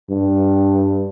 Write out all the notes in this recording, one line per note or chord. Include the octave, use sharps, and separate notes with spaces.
G2